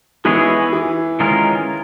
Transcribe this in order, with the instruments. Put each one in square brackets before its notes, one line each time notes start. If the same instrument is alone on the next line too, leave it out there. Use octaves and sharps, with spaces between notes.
[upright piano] E3 [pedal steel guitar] G#3 B3 E4 G#4 C#5
[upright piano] E3
[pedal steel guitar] D#3 G#3 C#4 F4 A#4